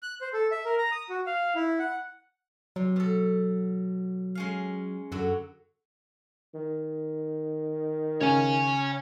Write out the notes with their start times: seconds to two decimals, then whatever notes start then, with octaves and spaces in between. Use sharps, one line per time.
0.02 F#6
0.21 C5
0.33 A4
0.51 E5
0.65 A#4
0.78 A#5
0.92 D#6
1.09 F#4
1.27 F5
1.55 E4
1.79 F#5
2.76 C3 F#3
2.96 B2 A4
4.35 G#3 C#4 F5
5.12 F#2 D3 F#3 F#4
6.54 D#3
8.21 C#3 C#5 G#5